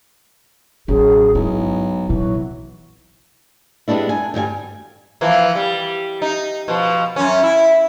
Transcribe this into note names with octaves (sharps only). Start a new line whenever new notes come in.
A1 F#2 G#4
B1 G#2 E4
A#1 C3 E3 F#3
G3 G#3 B3 D4 E4
G#5
D2 G2 G3 G#5
E3 F3 A#3
G3
D#4
B2 F3
F#2 C#4
E4